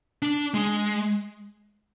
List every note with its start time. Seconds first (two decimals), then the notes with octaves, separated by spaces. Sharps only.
0.22 D4
0.54 G#3